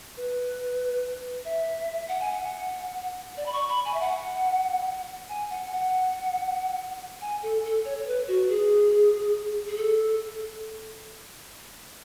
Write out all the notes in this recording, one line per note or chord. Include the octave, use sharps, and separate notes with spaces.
B4
E5
F#5
G#5
F#5
D5
B5
C#6
B5
G#5
E5
F#5
G#5
F#5
F#5
G#5
A4
A4
C#5
C#5
B4
F#4
G#4
G#4
A4